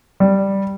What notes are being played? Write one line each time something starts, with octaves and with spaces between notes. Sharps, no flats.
G3